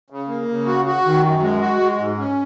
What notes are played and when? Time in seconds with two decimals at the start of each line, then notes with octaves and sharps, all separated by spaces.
0.10 C#3
0.28 A#3
0.48 C#3
0.66 F#4
0.86 F#4
1.05 D#3
1.24 F#2
1.42 G#3
1.61 F#4
1.80 G#3
1.99 G#2
2.18 C#4